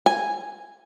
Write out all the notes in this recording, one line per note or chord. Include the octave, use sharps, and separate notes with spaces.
G#5